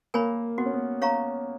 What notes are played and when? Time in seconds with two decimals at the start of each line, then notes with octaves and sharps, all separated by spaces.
0.14 A#3 A#4 C#5 G#5 B5
0.58 B3 F#4
0.66 C#4
0.74 B3
1.01 C#4 C#5 F5 A#5 C#6